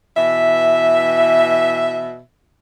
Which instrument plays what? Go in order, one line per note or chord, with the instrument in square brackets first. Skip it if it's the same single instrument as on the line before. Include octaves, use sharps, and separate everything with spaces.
[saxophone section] B2 E3 E5